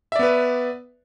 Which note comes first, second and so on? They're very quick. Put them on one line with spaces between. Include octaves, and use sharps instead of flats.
E5 D5 B3 B4